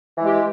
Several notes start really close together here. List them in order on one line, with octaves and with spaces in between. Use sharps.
E3 G#3 G4